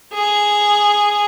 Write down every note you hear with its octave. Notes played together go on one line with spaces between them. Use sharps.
G#4